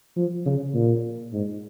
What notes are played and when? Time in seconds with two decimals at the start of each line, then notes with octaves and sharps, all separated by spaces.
0.17 F3
0.46 C#3
0.74 A#2
1.33 G#2